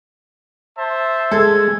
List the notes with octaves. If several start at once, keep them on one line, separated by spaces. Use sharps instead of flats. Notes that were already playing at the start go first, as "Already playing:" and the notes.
C5 E5 A5
G#3 A4 G#6